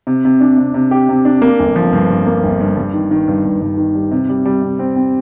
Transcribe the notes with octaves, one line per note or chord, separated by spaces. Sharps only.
C3
C3
D4
C3
C3
G4
C3
D4
A#3
G1
F3
G2
G2
A#3
G1
G2
G2
D#3
D#3
G2
G2
G2
D#3
G3
C3
G3
G3
C3
C4
C4